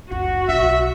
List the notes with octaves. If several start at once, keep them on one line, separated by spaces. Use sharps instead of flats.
F#1 C#2 F#4
B1 D4 E5